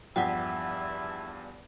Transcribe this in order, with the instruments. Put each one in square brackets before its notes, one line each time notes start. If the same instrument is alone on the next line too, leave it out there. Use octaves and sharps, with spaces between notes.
[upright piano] E2 G2 F3 [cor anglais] E4 [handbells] F#5 G5